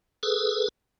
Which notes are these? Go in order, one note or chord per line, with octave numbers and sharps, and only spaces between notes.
G#4 A4 B4